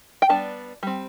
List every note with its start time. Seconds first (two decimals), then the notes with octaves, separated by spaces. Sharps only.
0.22 G5
0.29 G3 B3 D4 A5
0.83 G3 C4